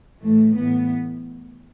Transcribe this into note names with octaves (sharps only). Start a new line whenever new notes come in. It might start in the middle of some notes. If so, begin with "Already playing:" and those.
A2 E3 A3
A2 E3 B3